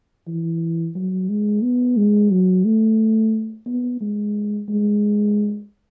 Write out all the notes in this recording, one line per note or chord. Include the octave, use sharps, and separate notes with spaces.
E3
F#3
G#3
B3
G#3
F#3
A3
B3
G#3
G#3